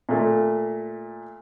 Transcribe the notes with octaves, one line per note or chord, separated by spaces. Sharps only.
A#2 A3